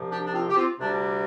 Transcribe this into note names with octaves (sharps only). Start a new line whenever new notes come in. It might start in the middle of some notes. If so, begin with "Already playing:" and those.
Already playing: C2 C3 F3
D4 G4
D4
C4 F4
G4
C4 F4
D2 C3 G3 D4